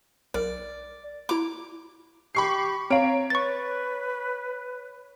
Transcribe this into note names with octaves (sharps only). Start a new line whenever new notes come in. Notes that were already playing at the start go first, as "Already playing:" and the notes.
B1 A#4 D5
E4 A#5 D6
G4 B5 C#6 C7
C4 C#5 F5 A#5 D7
B4 C#6 A6